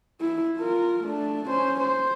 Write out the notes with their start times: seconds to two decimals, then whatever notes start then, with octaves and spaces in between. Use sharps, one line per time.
0.21 E4
0.58 F4 A#4
1.04 A3 D4
1.48 C#4 C5
1.81 C5